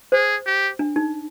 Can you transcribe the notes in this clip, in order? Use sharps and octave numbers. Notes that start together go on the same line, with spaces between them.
G#4 C5
G4
D4
D#4